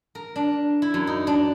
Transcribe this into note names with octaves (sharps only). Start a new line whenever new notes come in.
A#4
D4
E4
F#2
D#4
D4